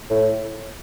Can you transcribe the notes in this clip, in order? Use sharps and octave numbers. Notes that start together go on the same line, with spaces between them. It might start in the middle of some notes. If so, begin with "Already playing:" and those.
A2